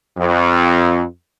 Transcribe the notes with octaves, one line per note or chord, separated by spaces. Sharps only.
F2